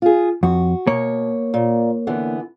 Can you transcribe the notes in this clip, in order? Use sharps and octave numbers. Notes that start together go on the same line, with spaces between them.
F4 G#4
F2 F#4
B2 A#3 C#5
A#2
D3 E3 B3